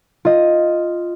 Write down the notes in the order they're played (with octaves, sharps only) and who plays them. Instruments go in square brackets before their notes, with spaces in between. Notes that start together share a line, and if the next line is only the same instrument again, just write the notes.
[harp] F4 D#5